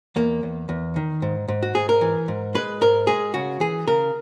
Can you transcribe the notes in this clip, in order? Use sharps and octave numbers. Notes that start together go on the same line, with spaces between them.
E2 A#3
E2
E2
D#3
G#2
G#2
F#4
G#2 G#4
A#4
E3
G#2
G#3 B4
G#2 A#4
G#3 G#4
C#3 F#4
E3 G#4
C#3 A#4